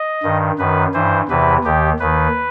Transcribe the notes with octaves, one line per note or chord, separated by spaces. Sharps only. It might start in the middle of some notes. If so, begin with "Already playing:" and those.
Already playing: D#5
G2 D#3
F#2 D#3 B4
G2 E3 C5
E2 C3 E3 B4
D#2 D#3 G4
D#2 D#3 B4